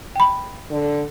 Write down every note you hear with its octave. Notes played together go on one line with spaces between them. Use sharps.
G5 B5
D3